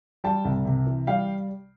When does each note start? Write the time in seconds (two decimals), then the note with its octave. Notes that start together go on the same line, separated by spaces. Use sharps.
0.24 G3 G5 A5
0.45 C2
0.65 C3
0.87 E3
1.07 G3 F5 G5